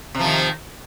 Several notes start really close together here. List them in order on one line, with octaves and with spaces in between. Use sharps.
C3 F3 D#3